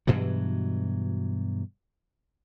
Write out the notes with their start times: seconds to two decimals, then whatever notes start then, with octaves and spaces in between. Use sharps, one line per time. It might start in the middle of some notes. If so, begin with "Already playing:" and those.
0.07 G2 B2 E3 F#3